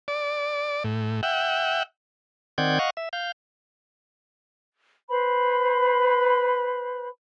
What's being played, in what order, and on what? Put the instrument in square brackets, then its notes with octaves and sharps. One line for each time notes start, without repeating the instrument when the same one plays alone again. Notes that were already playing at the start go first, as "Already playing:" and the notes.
[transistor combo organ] D5
A2
E5 F#5 G5
[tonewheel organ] D#3 C4 D5 F#5 G6 G#6
D#5 F5 F#5 C#6
E5
F5 G6
[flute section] B4 C5 B5